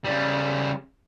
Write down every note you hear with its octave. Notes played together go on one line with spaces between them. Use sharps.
C#3 G3